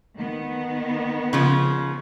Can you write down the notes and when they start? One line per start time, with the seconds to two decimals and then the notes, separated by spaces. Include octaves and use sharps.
0.17 D#3 B3
1.33 C#3 F3